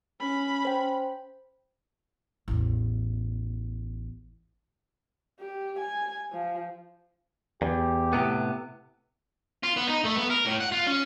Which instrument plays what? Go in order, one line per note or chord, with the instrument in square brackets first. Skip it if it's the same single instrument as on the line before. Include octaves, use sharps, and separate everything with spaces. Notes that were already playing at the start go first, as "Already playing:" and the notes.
[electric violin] C#4 B5
[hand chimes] C5 G5
[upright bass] A1 E2
[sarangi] G4
G#5
F3
[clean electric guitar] E2 [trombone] G4
[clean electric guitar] A2 C3 B3
[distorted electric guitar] F4
B3
D#4
A3
B3
A#4
A2
F#5
F4
C#4